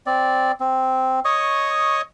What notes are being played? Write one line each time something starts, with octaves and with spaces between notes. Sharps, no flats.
C4 D5
C4
C#5 D#5 C#6 D#6